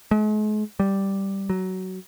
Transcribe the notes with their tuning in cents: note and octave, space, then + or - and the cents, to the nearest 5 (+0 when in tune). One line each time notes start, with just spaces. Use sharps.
G#3 +45
G3 -5
F#3 +15